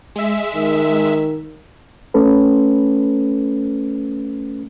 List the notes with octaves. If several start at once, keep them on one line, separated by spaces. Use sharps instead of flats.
G#3 E5
D#3
A3 C#4 A4 B4